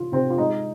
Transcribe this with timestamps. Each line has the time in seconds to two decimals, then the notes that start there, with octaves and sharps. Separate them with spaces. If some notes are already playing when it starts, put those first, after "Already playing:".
Already playing: C3 F3 F4
0.12 C3 C4
0.30 F4
0.38 G#3 D#4